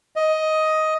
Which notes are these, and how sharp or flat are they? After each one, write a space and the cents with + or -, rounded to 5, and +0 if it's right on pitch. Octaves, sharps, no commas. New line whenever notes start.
D#5 +10